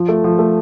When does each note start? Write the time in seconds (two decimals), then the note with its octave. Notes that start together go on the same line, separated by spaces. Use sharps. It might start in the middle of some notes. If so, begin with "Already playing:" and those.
Already playing: F3
0.09 A3
0.24 F3
0.39 A3